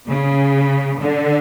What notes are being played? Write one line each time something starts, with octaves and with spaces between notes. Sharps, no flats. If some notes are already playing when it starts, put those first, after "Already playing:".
C#3
D3